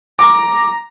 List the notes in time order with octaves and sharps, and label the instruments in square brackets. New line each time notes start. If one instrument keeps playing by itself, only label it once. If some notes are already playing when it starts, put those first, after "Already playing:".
[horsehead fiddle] A#5 [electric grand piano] D6